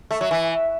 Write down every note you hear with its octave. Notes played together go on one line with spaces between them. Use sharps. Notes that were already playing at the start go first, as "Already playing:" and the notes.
A3
F#3
E3